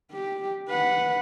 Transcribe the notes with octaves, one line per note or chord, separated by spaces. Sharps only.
G4
B4 F#5